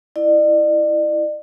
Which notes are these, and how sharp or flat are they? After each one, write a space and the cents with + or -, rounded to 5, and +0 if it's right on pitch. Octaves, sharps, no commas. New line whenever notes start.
E4 +0 D5 +40